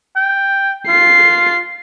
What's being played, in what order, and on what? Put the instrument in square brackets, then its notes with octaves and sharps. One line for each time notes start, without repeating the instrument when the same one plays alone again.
[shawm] G5
[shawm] F4 [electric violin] C7